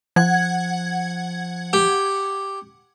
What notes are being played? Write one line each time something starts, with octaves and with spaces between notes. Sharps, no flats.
F3 F#5 G#6
G4